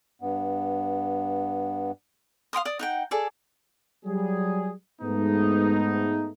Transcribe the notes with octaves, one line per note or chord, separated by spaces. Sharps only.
G2 B3
F5 G5 C6 D#6
D5 D#6
D#4 F#5 G5
G#4 A4 D5
F#3 G3 G#4
G#2 A3 B3 D#4